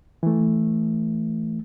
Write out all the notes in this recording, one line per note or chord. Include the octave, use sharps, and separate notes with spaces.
E3 A3